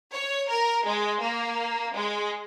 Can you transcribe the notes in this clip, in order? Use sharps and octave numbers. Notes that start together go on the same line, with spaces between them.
C#5
A#4
G#3
A#3
G#3